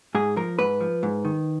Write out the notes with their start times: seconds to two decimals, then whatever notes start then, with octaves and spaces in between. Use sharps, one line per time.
0.15 G#2 G#4
0.36 F3 A#4
0.59 G#2 B4
0.81 F3
1.03 G#2
1.25 D#3